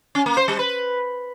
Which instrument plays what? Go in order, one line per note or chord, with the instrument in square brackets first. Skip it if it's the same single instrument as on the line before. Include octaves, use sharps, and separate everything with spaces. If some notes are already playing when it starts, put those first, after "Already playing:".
[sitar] C#4
A#3
C5
G3
B4